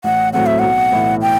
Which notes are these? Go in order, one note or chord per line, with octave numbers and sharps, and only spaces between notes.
A1 F#5
A2 F#3 A3 C4 F#5
E5
B1 F#5
A2 E3 A3 E4
G5